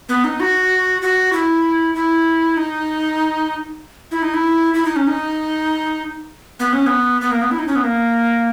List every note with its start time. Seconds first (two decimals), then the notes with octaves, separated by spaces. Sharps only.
0.09 B3
0.24 D#4
0.40 F#4
1.02 F#4
1.33 E4
1.95 E4
2.57 D#4
4.11 E4
4.22 D#4
4.34 E4
4.74 E4
4.85 D#4
4.96 C#4
5.07 D#4
6.60 B3
6.73 C#4
6.86 B3
7.21 B3
7.31 A#3
7.42 B3
7.51 E4
7.59 D#4
7.67 C#4
7.75 B3
7.84 A#3